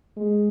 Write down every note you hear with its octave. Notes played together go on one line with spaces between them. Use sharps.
G#3